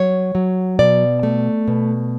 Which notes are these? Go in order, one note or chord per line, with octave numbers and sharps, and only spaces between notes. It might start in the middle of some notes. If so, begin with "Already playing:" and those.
Already playing: F#3 C#5
F#3
B2 D5
A3
B2